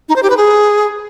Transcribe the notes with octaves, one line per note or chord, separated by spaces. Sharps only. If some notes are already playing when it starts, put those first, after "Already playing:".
D#4
C5
G4
B4
G#4